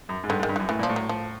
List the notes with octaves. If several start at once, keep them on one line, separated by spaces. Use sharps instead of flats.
F#2
G#2
G2 D3
G#2
D#3
G2
F#2 E3
A2 E3
A#2 F3
A2
F#3
F3